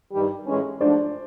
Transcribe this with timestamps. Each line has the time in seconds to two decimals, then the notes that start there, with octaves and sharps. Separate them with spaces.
0.12 G2 D#3 G3
0.46 A2 E3 G#3 C#4
0.80 G#2 F3 A3 D4 C5 D5